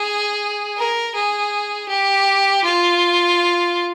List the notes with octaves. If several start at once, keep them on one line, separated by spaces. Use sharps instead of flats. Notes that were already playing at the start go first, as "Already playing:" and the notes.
Already playing: G#4
A#4
G#4
G4
F4